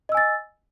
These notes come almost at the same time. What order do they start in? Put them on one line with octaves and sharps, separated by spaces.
D#5 E6 G#5 A6